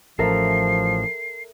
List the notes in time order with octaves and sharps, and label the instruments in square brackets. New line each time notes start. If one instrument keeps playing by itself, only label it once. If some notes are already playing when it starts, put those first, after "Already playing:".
[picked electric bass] A1 [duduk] F3 [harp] A4 A#4 E5 [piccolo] C7